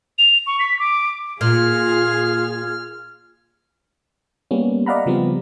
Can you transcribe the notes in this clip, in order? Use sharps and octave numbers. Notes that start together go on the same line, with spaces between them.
F7
C#6
B6
D6
A#2 F4 G#4 F6 G#6
G3 A#3 B3 C#4
D5 D#5 F5 F#5 A#5 B5
C#3 F3 G3 B3 C4